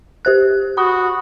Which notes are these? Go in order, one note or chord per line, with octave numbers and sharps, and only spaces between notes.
G4 C5 F#6
F#4 B5 D#6